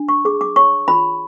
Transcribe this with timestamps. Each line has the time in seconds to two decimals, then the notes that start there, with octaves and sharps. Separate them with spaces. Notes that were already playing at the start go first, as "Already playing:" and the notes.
Already playing: D4
0.09 C#6
0.25 G#4 D6
0.41 D6
0.56 C#5 C#6
0.88 F4 B5